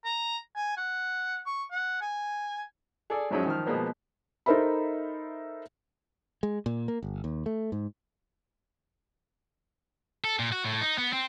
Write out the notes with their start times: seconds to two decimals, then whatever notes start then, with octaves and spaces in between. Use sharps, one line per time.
0.05 A#5
0.56 G#5
0.77 F#5
1.46 C#6
1.71 F#5
2.01 G#5
3.10 G#4 A4 D5
3.31 F#2 F3 F#3 G#3 C#4
3.46 D#3 F3 F6
3.66 B2 F3 G#3 A#3 B3
4.46 D#4 A4 A#4 C5 E5 B5
6.43 G#3
6.66 A#2
6.88 A#3
7.03 G1
7.24 D#2
7.46 A3
7.72 G#2
10.24 A4
10.39 A#2
10.52 F#4
10.65 A2
10.81 D#4
10.98 B3
11.13 C4